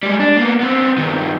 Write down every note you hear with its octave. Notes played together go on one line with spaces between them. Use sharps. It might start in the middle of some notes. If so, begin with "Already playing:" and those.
G3 G#3
D4
A#3 B3
B3 C4
G2 D#3